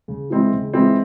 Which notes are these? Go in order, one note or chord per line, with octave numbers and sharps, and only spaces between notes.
C#3
E3 G#3 C4 E4
C#3
E3 G#3 C4 E4